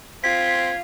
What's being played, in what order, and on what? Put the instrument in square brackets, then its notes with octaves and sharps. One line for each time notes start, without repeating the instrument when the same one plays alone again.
[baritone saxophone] C4 [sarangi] F4 [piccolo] G#6 [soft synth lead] B6